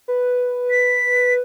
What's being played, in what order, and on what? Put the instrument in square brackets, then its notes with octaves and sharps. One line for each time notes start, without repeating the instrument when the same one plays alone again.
[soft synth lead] B4
[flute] B6